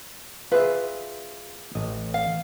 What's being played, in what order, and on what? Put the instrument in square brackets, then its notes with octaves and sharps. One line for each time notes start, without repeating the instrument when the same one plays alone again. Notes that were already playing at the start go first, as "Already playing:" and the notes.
[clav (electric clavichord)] F4 G#4 E5 [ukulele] B4
[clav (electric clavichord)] A1 D#5
[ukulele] F5